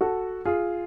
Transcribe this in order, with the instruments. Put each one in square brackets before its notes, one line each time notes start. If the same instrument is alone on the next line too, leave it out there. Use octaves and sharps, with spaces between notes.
[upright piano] F#4 A4
F4 G#4